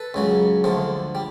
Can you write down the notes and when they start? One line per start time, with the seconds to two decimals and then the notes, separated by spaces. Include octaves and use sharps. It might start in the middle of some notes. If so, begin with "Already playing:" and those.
Already playing: A4 B4
0.14 C#2 C#3 F#3
0.64 D2 D3 F3
1.15 G3